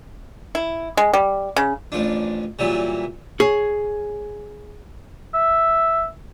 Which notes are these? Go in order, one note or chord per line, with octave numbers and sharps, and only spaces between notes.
E4
G#3
G3
C#3
A1 F3 D4
A#2 E3 F#3 G3
G#4 C#5
E5